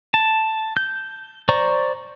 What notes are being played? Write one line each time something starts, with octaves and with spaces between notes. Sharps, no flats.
A5
G6
C5 D5 A#5 C#6